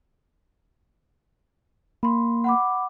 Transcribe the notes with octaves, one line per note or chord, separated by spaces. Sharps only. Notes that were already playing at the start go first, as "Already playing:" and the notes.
A#3 B5 C6
F#5 B5 D6